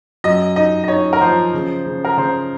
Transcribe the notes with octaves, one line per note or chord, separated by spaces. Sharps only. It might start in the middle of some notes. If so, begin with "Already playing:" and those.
F#2 D#5
D#4 D#5
D#5
D#4 C#5
A#4
F3 C5
C#3
C#3
A#4
C#3 C5